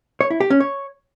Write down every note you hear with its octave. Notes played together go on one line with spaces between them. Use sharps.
C#5
E4
G4
C#4
C#5